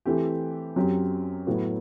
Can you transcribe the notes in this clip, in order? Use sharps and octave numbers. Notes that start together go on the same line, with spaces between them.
E3 A3 C4 G4
F#2 F#3 C4 G4
A2 F#3 B3 F#4